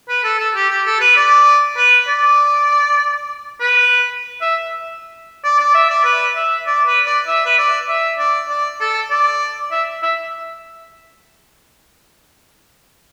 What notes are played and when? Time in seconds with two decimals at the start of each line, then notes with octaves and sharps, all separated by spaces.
0.09 B4
0.24 A4
0.39 A4
0.55 G4
0.70 G4
0.86 A4
1.01 B4
1.16 D5
1.77 B4
2.07 D5
3.61 B4
4.41 E5
5.44 D5
5.59 D5
5.75 E5
5.90 D5
6.04 B4
6.35 E5
6.67 D5
6.86 B4
7.06 D5
7.27 E5
7.46 B4
7.58 D5
7.89 E5
8.19 D5
8.49 D5
8.80 A4
9.10 D5
9.71 E5
10.02 E5